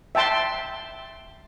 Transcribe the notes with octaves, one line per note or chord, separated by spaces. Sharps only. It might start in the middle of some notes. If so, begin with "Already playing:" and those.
E5 G5 A5 C6